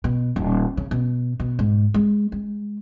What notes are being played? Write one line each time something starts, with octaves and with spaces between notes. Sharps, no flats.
B2
D#1
C#3
B2
B2
G#2
G#3
G#3